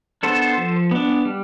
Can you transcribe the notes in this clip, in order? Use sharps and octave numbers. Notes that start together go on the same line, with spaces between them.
B3 D4 A4 C5
F3
B3 D4
G3